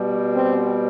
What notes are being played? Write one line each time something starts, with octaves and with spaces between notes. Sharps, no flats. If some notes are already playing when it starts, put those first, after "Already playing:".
Already playing: B2 G3
C4